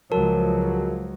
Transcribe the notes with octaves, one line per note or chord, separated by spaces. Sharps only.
C#2 F3 F#3 F#4 A#4 A5